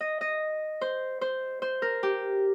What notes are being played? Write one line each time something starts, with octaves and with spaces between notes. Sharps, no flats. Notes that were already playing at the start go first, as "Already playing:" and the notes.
D#5
D#5
C5
C5
C5
A#4
G4